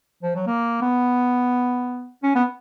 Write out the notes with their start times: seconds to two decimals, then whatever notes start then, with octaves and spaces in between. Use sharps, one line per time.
0.23 F3
0.35 F#3
0.47 A#3
0.82 B3
2.23 C#4
2.35 B3